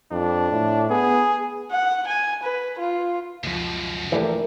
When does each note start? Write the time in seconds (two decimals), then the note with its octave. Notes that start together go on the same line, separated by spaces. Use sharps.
0.11 F2 D4
0.51 A2
0.90 B3 G#4
1.71 F#5
2.07 G#5
2.43 B4
2.79 F4
3.44 C#2 F#2 B2 F3
4.12 A#1 E3 A3 G4 A4 A#4 D5